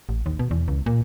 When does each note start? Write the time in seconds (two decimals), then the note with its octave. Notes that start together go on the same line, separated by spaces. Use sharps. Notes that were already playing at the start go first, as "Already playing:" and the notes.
0.09 A1
0.26 D#2
0.39 B2
0.51 E2
0.68 C#2
0.86 A#2